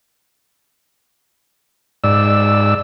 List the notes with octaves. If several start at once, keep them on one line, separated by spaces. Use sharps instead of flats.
G#2 D5 E6